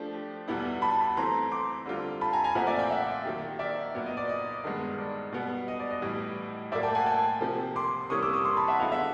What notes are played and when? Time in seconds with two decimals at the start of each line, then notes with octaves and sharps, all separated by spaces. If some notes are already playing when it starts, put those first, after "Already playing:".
Already playing: F3 A3 D4 G4
0.48 E2 B2 G3 B3 E4
0.82 A5 B5
1.17 E3 A3 C4 A#5 C6
1.51 C6 D6
1.86 D3 G3 C4 F4
2.21 A5 B5
2.33 G#5 A#5
2.44 G#5 A#5
2.55 A#2 F3 A3 C4 E5 F#5
2.67 D5 E5
2.79 F5 G5
2.90 E5 F#5
3.25 D#3 F#3 A#3 D#4 G4
3.59 D5 E5
3.95 A#2 F#3 B3
4.06 D#5
4.17 D5
4.29 D#5
4.64 G2 D#3 G#3 B3
4.98 D5
5.33 B2 G3 B3
5.68 D#5
5.80 D5
5.91 D#5
6.02 A2 E3 G3
6.72 A2 F#3 A#3 D5 E5
6.83 G5 A5
6.95 F#5 G#5
7.06 G5 A5
7.41 C3 F3 A#3
7.76 C6 D6
8.10 C3 E3 G3 A#3 C#4 C#6 D#6
8.23 D6 E6
8.33 C#6 D#6
8.45 C6 D6
8.57 A5 B5
8.68 E5 F#5
8.80 D3 F#3 B3 E4 G#4 D#5 F5
8.92 E5 F#5